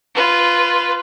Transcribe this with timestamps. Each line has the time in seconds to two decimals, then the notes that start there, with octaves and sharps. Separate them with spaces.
0.15 F4 B4